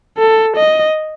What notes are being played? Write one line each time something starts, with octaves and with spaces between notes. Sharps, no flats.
A4
D#5